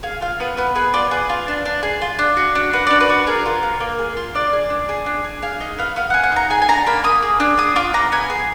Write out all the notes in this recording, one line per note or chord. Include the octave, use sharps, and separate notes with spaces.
G#4 F5
F4 F5
B3 B4
B3 B4
G#4 B4
F4 D5
G#4 B4
F4
D4
D4
G#4
F4
D4
F#4
D4
F#4 B4
D4 D5
B4
F#4
G#4 A#4
F4
A#3
A#3
G#4
F4
D4 D5
G#4
D4
G#4
D4
G#4
G#4 F5
D#4 D#5
B3 F5
B3 F5
G#4 F#5
F#5
D#4 A#5
G#4 G#5
G#5
D4 A#5
A#3 B5
A#3 D#6
G#4
D4
G#4 D#6
F4 D6
B3 A#5
B3 G#5
G#4